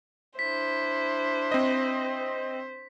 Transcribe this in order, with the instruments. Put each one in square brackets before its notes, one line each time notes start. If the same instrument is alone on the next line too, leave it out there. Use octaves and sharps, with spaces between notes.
[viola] D4 E4 [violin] C5 [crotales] B6
[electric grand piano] C4 D#5